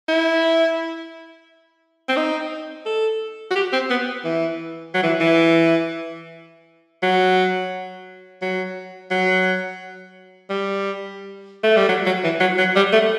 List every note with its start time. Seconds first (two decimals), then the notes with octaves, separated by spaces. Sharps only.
0.08 E4
2.09 C4
2.17 D#4
2.86 A4
3.51 F#4
3.56 G4
3.73 C4
3.90 B3
4.25 E3
4.94 F#3
5.03 E3
5.21 E3
7.03 F#3
8.42 F#3
9.11 F#3
10.50 G3
11.64 A3
11.77 G3
11.89 F#3
12.06 F#3
12.24 E3
12.40 F#3
12.58 F#3
12.76 G3
12.93 A3